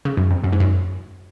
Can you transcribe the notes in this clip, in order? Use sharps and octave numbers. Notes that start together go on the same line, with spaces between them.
C#3
F#2
F2
F#2
G#2
F#2